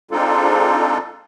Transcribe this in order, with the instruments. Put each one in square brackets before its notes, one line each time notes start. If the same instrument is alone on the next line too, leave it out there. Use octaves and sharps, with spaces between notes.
[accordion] G#3 C4 D4 D#4 F4 A4